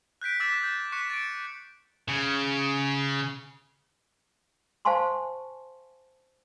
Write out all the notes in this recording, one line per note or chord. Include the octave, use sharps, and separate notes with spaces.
F#6 G6 B6 D7
D6 E6 A6 B6 E7
G6 A6
C#6 F#6 B6 C#7 E7
A6 D7
C#3
C5 F5 G#5 A5 C6 C#6